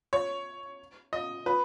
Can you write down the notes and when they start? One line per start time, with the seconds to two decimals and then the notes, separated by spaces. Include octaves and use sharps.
0.13 C#5
1.13 D#5
1.46 B4